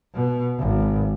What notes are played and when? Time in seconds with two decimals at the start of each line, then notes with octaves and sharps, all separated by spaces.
0.14 B2
0.59 G#1